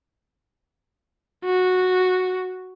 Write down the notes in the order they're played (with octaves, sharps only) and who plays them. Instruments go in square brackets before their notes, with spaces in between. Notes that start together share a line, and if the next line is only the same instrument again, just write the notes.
[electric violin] F#4